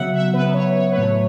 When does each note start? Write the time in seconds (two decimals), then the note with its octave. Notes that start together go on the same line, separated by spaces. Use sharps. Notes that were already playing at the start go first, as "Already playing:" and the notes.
Already playing: C#3 F#3 B3 E5 F#5
0.14 E5
0.34 C#3 F#3 B3 B4
0.54 C#5
0.75 C#5
0.91 B4
0.95 A2 F#3 A3 C#5